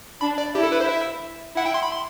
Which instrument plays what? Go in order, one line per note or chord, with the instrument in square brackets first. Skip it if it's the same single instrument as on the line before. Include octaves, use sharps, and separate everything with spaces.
[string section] D4 [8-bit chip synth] B5
[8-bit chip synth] D5
[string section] E4 [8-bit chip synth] G4
[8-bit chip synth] A4
B4
C5
E5
[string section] E4 [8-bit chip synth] F#5
[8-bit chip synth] G5
C6
B5
C6